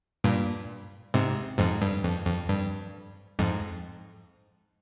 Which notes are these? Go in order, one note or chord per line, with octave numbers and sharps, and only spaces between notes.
G2 A#2
G#2 C3
F2 G#2
G2
F2
F2
G2
F2 G#2